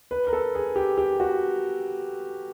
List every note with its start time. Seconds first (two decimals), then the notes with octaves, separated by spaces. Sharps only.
0.11 B4
0.27 A#4
0.33 A4
0.55 G#4
0.76 G4
0.98 G4
1.20 F#4